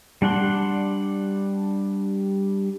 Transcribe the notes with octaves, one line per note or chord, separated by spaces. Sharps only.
G3 D4 F#5 C6